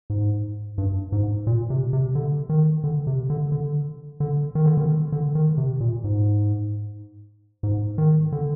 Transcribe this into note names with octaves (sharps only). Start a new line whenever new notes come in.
G#2
G2
G#2
A#2
C3
C3
D3
D#3
D3
C3
D3
D3
D3
D#3
D3
D#3
D3
D#3
C3
A#2
G#2
G#2
D#3
D3